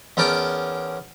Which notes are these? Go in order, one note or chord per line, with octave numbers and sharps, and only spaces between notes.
E2 C#4 A#4 G5 A5 D6